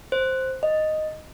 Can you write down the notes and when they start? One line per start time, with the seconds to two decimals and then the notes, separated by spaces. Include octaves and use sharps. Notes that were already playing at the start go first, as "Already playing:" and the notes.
0.12 C5
0.63 D#5